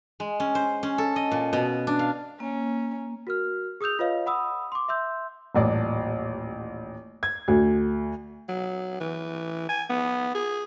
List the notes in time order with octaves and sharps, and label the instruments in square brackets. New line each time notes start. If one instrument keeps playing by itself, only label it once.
[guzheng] G#3
C#4
C5
C#4
A4
D#5
A#2
B2
D4
F5
[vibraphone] A#3 [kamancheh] C#4
[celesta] F#4 A#4 F6
G#4 D#6 E6 G6 F7
F4 B4 C#5 D#5 F5
F#5 B5 D#6 E6
C6 D6
E5 C6 E6 G6
[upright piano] D#1 A1 D5
G#6
[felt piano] D2
[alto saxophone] F#3
E3
G#5
B3
G#4